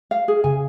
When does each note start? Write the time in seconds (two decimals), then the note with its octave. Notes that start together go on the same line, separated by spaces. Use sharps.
0.11 F5
0.28 G#4
0.44 C#3 G#5